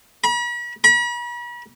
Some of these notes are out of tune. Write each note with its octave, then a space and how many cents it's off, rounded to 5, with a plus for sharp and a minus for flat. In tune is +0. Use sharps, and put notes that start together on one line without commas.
B5 -45
B5 -45